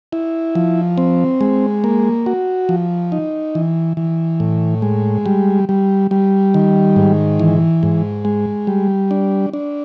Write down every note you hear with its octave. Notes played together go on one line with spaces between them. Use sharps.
E4
F3
C4
G#3
A#3
F#4
F3
D#4
E3
E3
A2
G#3
G3
G3
G3
D#3
G#2
E3
G#2
G#3
G3
D4
D4